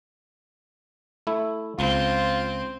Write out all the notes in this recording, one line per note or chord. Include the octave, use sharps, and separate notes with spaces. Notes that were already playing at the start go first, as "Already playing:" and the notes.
A3 E4
C#2 C4 F4